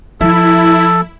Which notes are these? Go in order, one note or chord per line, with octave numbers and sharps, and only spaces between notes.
F3 E4 A4